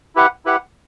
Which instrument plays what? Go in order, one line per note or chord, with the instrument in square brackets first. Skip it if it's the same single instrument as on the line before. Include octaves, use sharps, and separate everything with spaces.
[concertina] E4 G4 B4 F#5
E4 G4 B4 F#5